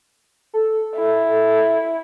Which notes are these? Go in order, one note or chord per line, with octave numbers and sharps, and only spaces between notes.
A4
E4